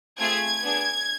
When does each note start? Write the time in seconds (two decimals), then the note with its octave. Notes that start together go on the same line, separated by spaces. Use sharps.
0.19 A3 C4 F4 G#4 G#6
0.61 B3 D4 G#4